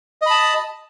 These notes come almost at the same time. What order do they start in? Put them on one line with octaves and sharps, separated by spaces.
D#5 B5 A5